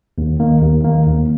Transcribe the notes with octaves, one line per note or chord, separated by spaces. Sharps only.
D#2
D#3 A#3
D#2
D#3 A#3
D#2